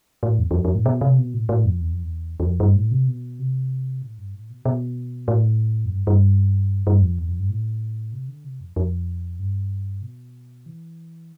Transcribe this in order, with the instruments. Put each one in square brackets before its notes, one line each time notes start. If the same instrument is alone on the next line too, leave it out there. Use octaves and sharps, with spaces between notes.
[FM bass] A2
E2
E2
F2
F2
A2
B2
C3
B2
A2
A2
F2
E2
F2
E2
E2
F2
G2
A2
C3
B2
C3
A2
G2
A2
B2
B2
A2
F2
G2
G2
G2
F2
E2
F2
G2
A2
C3
D3
C3
F2
F2
G2
B2
E3